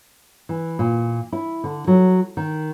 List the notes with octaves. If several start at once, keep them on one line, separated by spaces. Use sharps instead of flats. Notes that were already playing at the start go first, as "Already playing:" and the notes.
E3
A#2
E4
D3
F#3
D#3